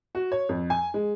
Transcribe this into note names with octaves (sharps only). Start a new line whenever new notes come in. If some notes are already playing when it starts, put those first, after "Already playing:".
F#4
C#5
F2
G#5
G#3